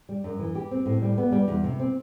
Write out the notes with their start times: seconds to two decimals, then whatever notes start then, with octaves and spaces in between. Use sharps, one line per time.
0.09 G3
0.24 F#2
0.39 E3
0.55 G4
0.71 C4
0.86 A2
1.02 G3
1.18 B3
1.32 G3
1.48 E2
1.64 C3
1.79 C4